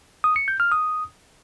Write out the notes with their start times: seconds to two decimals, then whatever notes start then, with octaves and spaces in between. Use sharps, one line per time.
0.24 D#6
0.36 C#7
0.48 G6
0.60 F6
0.72 D#6